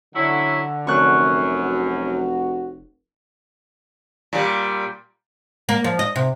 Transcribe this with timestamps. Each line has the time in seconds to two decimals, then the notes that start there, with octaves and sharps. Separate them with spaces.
0.15 D3 F#3 C#4 E4
0.87 F1 F#2 C#6 F#6
1.61 F#4
4.33 A#2 G3
5.69 A#3
5.84 F3
5.99 D#5
6.16 C3